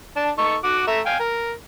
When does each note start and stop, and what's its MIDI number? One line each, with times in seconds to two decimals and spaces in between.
0.16 0.31 62
0.16 0.31 81
0.38 0.56 63
0.38 0.56 69
0.38 0.56 85
0.64 0.84 66
0.64 0.84 78
0.64 0.84 86
0.87 1.00 57
0.87 1.00 76
0.87 1.00 82
1.06 1.17 77
1.06 1.17 79
1.06 1.17 80
1.20 1.52 70